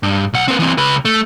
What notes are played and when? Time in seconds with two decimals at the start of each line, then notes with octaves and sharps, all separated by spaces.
0.03 G2
0.33 B1 F#5
0.48 C4 B4
0.59 E3 C4
0.78 C#2 B4
1.05 A3